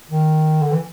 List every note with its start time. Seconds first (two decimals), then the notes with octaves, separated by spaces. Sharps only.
0.10 D#3
0.61 D3
0.72 E3